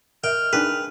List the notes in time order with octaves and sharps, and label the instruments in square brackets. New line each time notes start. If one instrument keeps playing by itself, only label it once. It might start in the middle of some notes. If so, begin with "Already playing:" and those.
[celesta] A#4 E5 [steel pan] D#5 [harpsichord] G5 [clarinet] F6
[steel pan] D4 D#4 G#4 [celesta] A#4 G5 [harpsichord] B4